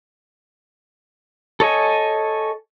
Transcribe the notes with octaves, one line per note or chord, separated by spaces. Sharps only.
A4 C#5 D#5 G#5